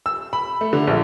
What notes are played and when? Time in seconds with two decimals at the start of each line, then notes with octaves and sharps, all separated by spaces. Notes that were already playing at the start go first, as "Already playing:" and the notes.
0.06 E6
0.33 B5
0.61 A3
0.73 D3
0.87 A#1